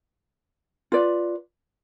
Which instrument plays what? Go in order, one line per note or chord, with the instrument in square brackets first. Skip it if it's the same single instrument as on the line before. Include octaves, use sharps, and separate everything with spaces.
[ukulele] F4 B4 D5